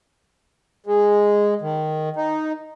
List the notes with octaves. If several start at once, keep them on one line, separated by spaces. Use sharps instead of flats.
G#3
D#3
D#4